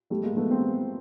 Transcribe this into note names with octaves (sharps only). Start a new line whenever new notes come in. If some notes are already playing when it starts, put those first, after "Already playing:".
G3 A3
G#3 A#3
A3 B3
A#3 C4